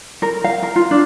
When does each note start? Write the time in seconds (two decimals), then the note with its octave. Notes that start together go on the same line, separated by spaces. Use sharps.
0.22 A#4
0.44 F5
0.63 A#4
0.76 F4
0.91 D4